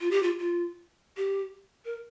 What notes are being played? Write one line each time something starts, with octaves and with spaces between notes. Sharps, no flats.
F4
G4
F4
F4
G4
A#4